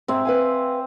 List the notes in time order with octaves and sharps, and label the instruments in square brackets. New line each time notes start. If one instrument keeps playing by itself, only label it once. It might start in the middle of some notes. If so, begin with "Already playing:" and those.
[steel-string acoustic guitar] G#2 G#3 [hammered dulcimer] C4 E5
[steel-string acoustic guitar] B4 F5 G#5